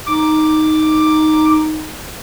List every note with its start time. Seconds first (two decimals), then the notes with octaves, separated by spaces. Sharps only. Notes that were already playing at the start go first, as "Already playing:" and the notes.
0.07 D#4 D6